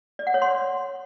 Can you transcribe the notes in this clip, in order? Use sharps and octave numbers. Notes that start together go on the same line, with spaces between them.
D5
F#5
C#5
C6